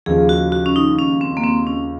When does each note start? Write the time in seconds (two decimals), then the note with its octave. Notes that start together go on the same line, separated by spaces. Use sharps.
0.06 D#2 C#3 F3 G#4
0.29 F#4
0.52 F#4
0.66 C#4
0.76 D#4
0.99 C#4
1.21 C4
1.37 A#3
1.44 C4
1.67 C#4